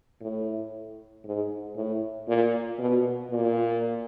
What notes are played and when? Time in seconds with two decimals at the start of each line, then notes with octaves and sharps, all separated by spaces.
0.21 A2
1.25 G#2
1.76 A2
2.28 A#2
2.79 B2
3.31 A#2